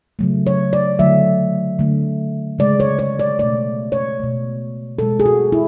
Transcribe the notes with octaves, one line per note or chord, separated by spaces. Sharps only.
C#3 F#3 A3
C#5
D5
D3 F#3 A3 E5
D3 A3
C#3 G#3 D5
C#5
C#5
D5
B2 A3 D5
C#5
B2 A3
B2 G#3 A4
G#4
F#4
E4